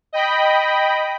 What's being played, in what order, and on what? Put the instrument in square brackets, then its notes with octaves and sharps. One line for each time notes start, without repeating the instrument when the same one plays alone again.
[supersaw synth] D#5 G5 B5